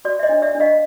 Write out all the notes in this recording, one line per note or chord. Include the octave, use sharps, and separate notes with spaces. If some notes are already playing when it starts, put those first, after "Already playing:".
F#4 D5
E5
C#5 D#5
D4
D5 E5
D4
D#5 F5